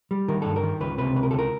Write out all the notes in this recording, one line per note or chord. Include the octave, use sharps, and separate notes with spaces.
G3
D#3 A#4
G2 A4
A#4
D#3
C#2 B4
C3 B4
C#2 B4
A#4
C#2 A4
A#4